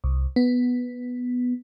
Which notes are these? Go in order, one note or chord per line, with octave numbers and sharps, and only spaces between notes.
C2
B3